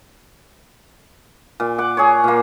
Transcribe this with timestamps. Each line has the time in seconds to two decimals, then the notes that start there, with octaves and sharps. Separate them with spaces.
1.60 A#2
1.78 F#5 D6
1.97 G#4 C#5
2.24 A#2 A#3